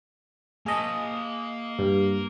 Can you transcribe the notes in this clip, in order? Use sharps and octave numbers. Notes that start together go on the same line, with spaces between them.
A#3 G#4 D#5 A5
G2